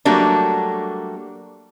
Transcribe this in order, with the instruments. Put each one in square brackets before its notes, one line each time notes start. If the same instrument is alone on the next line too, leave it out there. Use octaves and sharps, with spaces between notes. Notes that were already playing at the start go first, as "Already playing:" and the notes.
[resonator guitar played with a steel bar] F#3 G3 A3 A#3 D4